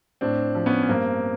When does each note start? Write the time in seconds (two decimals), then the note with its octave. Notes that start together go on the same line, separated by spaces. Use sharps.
0.21 A2 C4 D4
0.55 F3
0.66 B3 C#4
0.83 C#4
0.88 G2 A#3 C4